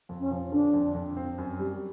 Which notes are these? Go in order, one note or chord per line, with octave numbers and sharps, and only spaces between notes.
F2
C#4
F3
D3 D4
F2
F2
C4
F#2
G3